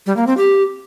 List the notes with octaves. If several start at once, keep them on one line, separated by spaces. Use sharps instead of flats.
G3
A#3
C4
G4